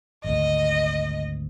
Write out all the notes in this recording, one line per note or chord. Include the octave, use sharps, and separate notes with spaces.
G#1 D2 D#5